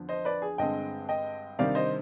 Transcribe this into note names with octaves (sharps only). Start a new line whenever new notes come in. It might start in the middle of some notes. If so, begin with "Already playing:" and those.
Already playing: F2 D3 F3 B3 D4
C5 D#5
B4 D5
G#4
G2 D3 G#3 C4 D#5 G5
D#5 G5
C3 D#3 G3 D4 D5 F5
C5 D#5